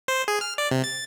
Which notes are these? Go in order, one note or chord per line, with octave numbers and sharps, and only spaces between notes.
C5
G#4
F6
D5
C3
A6